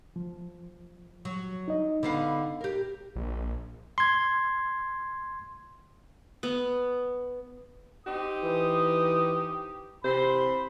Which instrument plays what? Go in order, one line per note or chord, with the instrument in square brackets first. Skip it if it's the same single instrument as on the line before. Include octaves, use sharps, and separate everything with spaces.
[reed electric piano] F3
[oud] F#3
[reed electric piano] D#4 D#5
[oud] D3 B3 F5
G4 A#4
[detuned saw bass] A#1
[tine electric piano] C6 G#6
[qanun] B3
[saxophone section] C4 D#4 G4 [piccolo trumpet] D#6
[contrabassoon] E3
[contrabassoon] C3 [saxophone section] E3 C5 [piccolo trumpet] B5